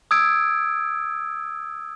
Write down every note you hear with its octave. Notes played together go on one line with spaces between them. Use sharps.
D#6 E6 G#6 D7